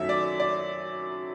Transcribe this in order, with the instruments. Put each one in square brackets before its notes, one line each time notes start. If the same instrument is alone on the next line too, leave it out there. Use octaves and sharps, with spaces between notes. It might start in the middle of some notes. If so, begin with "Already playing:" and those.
Already playing: [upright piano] F#2 D#3 F#3 A3 E5
D5
D5